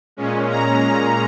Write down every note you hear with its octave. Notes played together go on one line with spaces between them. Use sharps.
A#2 G#3 C#4
A#5